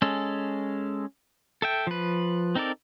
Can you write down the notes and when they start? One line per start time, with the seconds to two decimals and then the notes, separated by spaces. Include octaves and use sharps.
0.02 G#3 C#4 A4
1.62 A4 E5 G5
1.87 F3 B4
2.55 C4 D#4 A4 A#4 D5